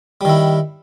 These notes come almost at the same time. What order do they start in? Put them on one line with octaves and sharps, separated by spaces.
G3 D#3 E4